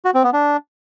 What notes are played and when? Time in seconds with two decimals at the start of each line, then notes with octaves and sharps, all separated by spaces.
0.05 F#4
0.14 C4
0.24 B3
0.33 D4